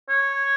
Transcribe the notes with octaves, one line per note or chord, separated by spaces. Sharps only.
C#5